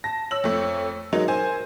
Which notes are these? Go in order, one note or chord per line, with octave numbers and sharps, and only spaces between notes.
A5 A#6
C#5 E6 F#7
F2 A3
F#3 G#3 D#4 A#4
C5 G#5